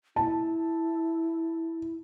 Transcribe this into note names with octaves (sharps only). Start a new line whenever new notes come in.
E4 A5